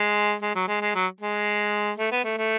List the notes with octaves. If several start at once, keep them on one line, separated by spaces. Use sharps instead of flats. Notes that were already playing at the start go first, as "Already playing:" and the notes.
Already playing: G#3
G#3
F#3
G#3
G#3
F#3
G#3
A3
B3
A3
A3